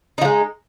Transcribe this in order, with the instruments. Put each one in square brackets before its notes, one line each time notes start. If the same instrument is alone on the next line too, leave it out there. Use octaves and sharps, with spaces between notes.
[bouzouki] D#4
F3
G#3